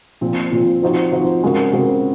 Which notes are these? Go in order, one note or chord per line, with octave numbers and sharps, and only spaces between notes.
A#2 F3 C4
A#2 F3 C4
F3 C4 D#4 F#4 C5
F3 C4 D#4 F#4 C5
C#3 G#3 C4 F#4 A#4
C#3 G#3 C4 F#4 A#4